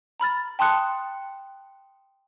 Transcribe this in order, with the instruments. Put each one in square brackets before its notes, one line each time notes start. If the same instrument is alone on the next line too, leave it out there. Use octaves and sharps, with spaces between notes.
[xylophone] A#5 B5 F6 A6
G5 A5 C6 D#6 F#6 C#7